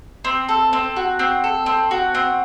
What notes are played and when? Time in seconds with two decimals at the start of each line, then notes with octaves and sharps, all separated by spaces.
0.25 C4
0.49 A4
0.73 C4
0.96 F#4
1.19 C4
1.44 A4
1.66 C4
1.91 F#4
2.15 C4